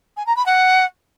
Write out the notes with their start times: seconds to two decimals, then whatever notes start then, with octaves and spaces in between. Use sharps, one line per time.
0.17 G#5
0.26 A#5
0.36 B5
0.46 F#5